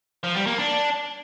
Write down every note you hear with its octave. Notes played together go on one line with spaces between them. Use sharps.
F3
G3
A#3
D4